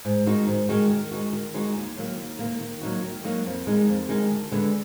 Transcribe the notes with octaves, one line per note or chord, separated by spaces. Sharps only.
G#2
D#3 G#3 D#4 F#4
G#2
D#3 G#3 D#4 F#4
D#3
G#3 D#4 F#4
D#3
G#3 D#4 F#4
D#2
D#3 F#3 A#3
D#2
D#3 F#3 A#3
D#3
F#3 A#3 D#4 F#4
D#3
F#3 A#3 D#4 F#4
F2
D#3 G#3 D#4
F2
D#3 G#3 D#4
D2
D3 G#3 B3